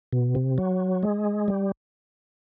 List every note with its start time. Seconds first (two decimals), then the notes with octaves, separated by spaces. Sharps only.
0.13 B2
0.35 C3
0.58 F#3
1.03 G#3
1.48 G3